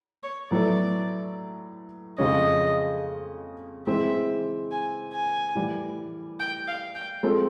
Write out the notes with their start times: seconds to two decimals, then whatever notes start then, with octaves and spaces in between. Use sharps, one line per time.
0.23 C#5
0.51 A2 F#3 B3 E4 A4 D5
2.18 F2 C#3 F3 G#3 C#4 D#5
3.87 E3 G#3 C4 E5
4.71 G#5
5.13 G#5
5.55 A2 E3 G3
6.40 G5
6.68 F5
6.95 G5
7.23 G#3 C4 F4 A4